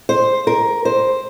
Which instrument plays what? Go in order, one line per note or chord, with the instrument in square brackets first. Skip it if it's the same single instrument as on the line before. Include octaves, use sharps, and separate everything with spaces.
[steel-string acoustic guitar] C5
A#4
C5